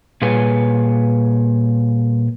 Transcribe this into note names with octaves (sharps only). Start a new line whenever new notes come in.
A#2 G3 G#4 B4 C#5 G#5